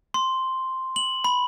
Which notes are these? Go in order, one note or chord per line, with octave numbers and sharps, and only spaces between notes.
C6
F#7
B5